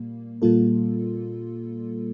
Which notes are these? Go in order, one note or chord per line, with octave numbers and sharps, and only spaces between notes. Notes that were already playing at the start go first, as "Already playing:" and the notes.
Already playing: A#2 G3 A#3
A#2 G3 A#3 F4 A4